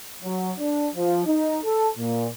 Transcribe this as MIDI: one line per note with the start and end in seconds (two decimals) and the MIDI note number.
0.23 0.51 54
0.58 0.88 62
0.95 1.25 53
1.26 1.58 63
1.63 1.89 69
1.97 2.27 46